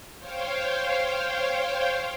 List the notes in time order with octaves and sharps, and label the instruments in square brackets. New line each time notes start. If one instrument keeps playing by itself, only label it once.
[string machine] C5 C#5 F5 G5